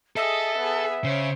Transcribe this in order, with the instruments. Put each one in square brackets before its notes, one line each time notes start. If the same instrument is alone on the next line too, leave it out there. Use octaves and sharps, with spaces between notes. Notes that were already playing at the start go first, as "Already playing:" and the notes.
[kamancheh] G#4 D#5 [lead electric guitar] A4 [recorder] E5
[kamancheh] B3 G#4
[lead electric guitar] C#3 [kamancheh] C5 C#5